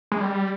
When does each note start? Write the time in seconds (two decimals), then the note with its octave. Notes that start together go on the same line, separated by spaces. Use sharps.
0.12 G#3
0.20 G3